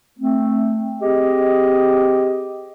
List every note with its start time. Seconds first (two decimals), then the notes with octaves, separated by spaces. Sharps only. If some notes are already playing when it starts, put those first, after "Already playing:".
0.19 A3 C4
1.02 C4 G4 G#4 D#5